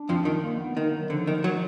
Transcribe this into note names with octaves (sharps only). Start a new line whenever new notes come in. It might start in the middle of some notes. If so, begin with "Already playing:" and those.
Already playing: D4
F2 F3
D#3
A#3
B3
D#3
F#3
D3 F3
D#3
F#3